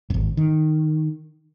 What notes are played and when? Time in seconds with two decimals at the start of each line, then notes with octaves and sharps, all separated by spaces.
0.10 D#1 G#1
0.37 D#3